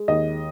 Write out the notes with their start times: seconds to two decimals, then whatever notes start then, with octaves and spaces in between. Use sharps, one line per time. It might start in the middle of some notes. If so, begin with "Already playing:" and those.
Already playing: G#3
0.08 D#2 D#5